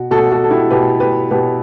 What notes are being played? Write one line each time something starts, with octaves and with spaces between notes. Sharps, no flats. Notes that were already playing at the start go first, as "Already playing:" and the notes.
Already playing: B2 F#4
B2 F#4 A4
F#4 A4
A4
E4 G4
B2 G4 B4
G4 B4
B2 G4 B4